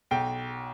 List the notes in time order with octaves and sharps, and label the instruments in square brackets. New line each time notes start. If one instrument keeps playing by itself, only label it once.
[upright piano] B1 G5